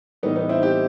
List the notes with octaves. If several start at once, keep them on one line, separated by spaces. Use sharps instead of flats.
A2 E3 G3 B3 D#4
B3 D#4
C4 E4
E4 G4